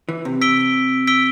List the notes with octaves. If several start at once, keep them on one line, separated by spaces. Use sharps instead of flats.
E3
C3
E6 B6 D7 G7
E6 B6 D7 G7